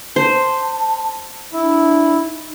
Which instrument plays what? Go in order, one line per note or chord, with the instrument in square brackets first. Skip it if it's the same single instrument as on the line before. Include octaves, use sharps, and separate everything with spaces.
[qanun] C5 [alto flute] A5
[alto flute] D4 [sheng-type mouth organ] E4
[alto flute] D#4